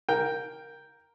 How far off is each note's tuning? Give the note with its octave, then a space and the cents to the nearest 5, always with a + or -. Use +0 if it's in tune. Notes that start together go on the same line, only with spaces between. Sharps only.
A#4 +0 G5 +0